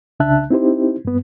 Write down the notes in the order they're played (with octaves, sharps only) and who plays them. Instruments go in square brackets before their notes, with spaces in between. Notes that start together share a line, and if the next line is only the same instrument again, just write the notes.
[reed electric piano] C2 C#3 D4 E5 A5 F#6
C4 D#4 E4 G4 C5
G2 B3